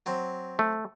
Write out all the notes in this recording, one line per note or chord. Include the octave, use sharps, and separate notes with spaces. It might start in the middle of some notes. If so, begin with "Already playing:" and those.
F#3 C4
A3